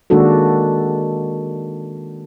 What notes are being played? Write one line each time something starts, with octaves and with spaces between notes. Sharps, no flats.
D#3 G#3 A#3 D4 F#4 A4